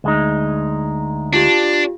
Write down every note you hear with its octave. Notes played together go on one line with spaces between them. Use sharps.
D2 G#3 D#4
D4 F4 G4